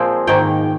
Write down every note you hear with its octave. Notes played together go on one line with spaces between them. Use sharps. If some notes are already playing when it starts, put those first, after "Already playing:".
Already playing: A#2 F3 G#3 C4 G5
G#2 D#3 A#3 G5